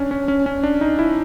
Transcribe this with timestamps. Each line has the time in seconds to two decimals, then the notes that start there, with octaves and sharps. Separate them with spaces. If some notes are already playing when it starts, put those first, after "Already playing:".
Already playing: C#4 D4
0.11 C#4
0.28 C#4
0.46 C#4
0.63 D4
0.81 D#4
0.99 E4